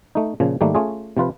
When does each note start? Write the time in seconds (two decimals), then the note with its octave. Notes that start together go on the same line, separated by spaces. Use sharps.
0.15 A3 D#4
0.40 A#2 C#3 F3
0.61 G#2 D#3 G3 A3 A#3
0.75 A3 C#4 F4 G#4
1.17 C3 F3 F4 B4